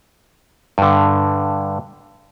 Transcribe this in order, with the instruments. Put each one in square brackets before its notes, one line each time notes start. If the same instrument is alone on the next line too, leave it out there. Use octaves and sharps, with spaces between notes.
[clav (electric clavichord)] G2 D3